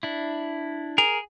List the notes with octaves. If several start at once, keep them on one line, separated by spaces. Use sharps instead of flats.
D4 E4
G#4 A#4